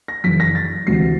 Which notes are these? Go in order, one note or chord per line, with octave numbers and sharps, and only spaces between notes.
A#6
F#2 C#3 E3 B6
A#6
A6
D2 C3 E3 C7